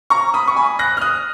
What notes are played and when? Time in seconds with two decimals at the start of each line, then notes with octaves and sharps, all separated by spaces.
0.10 A#5 C#6
0.34 B5 D#6
0.48 C#6
0.56 G#5 B5
0.79 F#6 A#6
0.97 F6
1.01 D#6 F#6